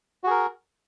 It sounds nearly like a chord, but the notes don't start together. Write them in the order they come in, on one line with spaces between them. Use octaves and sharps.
F#4 G#4 A#4